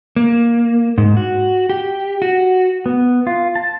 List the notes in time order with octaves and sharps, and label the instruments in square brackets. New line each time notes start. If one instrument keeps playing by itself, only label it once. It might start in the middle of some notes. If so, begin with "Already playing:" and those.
[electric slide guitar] A#3
G#2
F#4
G4
F#4
[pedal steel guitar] B3
F4
A5